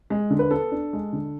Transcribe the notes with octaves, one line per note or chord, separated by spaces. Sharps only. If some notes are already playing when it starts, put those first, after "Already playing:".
G#3
D3
B4
B3 A4
D4
G#3
D3